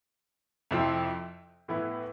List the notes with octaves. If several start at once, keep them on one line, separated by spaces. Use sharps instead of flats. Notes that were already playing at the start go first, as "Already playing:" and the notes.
F2 C3 F3 C4 E4
A2 E3 B3 E4